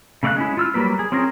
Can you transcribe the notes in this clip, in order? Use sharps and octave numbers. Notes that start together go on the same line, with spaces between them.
C#3 A3 D5 F5 F#6
G#3 C#4 E4
F4 E6 F6
F#3 G3 A#3 B4
G#4
C4 C#4 F4 G#4 A#4